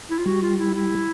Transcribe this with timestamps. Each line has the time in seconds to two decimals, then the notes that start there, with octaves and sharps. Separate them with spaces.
0.10 E4
0.19 F4
0.26 G3 F#4
0.42 F4
0.59 E4
0.75 E4